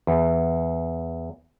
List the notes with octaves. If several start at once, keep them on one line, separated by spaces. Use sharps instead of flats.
E2